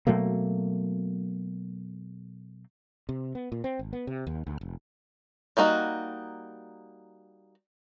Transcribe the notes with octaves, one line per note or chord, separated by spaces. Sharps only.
B2 F#3 A3 A#3
C3
B3
A#2
C4
G#1
B3
C3
D#2
D2
F1
G3 A#3 D#4 F#4